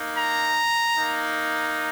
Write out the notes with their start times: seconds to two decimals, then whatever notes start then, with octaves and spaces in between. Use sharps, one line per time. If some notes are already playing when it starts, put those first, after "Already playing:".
Already playing: A#3 D#4
0.15 A#5
0.97 A#3 D#4